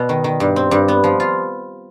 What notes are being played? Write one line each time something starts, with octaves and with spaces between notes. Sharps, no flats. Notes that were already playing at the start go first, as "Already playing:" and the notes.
Already playing: B2
D#3
D#3
G2
C4
G2
B3
F3
F4